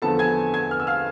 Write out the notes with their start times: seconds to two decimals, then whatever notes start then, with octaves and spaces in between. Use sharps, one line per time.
0.02 E2 D3 F3 B3 A4 A5
0.19 G#5 G#6
0.54 G#5 G#6
0.71 F6
0.80 E6
0.87 F5 F6